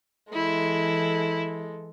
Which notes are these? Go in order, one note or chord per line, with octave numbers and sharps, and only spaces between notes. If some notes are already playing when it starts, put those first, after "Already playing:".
E3 G#3 E4 A4